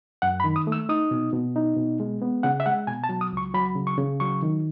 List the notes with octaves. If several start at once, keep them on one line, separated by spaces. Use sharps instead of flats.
F#2 F#5
B5
D#3
D#6
A3
E6
D#4 D#6
B2
B2
D#4
B2
G#3
B3
C#3 F#5
E5
G#3 F#5
B2 G#5
A5
F#3
D#6
C#2 C#6
F#3 B5
C#3
C#6
C#3
F#3 C#6
D#3